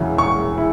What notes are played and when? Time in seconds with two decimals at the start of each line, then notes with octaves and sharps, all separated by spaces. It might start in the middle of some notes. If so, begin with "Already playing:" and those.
Already playing: E1 E2 C#3 F#3 E4
0.18 E1 C#6
0.58 E4